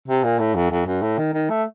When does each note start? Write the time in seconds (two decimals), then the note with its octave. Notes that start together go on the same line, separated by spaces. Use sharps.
0.08 C3
0.24 A#2
0.39 A2
0.55 F2
0.71 F2
0.86 F#2
1.02 A2
1.18 D#3
1.34 D#3
1.50 A3